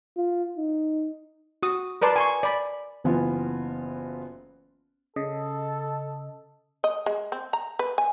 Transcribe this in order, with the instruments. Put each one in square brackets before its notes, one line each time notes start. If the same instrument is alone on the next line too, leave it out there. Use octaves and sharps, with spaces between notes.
[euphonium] F4
D#4
[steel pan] F#4 D#6
A#4 B4 D5 A5 C6
G#5 C6 C#6
D5 B5
[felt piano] F#1 E3 B3 F4
[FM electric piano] C#3 D#5 [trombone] A4
[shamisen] D#5
G#3
C4
A#5
B4
G#5